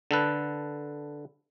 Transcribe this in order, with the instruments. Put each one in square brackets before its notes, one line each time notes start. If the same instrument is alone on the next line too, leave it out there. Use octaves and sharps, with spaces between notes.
[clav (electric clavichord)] D3 A4 B4